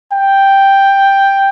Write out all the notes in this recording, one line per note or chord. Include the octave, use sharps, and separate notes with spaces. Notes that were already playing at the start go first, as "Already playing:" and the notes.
G5